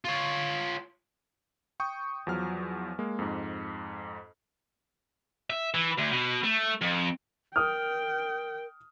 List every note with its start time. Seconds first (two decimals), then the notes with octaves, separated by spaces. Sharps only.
0.05 F4 C#5
1.80 G5 C#6 D#6 G6
2.27 E2 F3 F#3 F6
2.99 G#3 A#3
3.19 F2 G#2
5.50 E5
5.75 E3
5.98 D2
6.12 B2
6.44 A3
6.82 F2
7.56 A#4 G5 D#6 F6